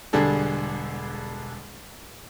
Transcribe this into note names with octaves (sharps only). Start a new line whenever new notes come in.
E1 D3 G3 D4 G#4 A4